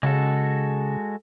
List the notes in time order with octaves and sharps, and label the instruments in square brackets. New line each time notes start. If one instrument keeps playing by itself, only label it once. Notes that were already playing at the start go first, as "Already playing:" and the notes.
[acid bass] C#3 [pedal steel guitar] G#3 F#4 A4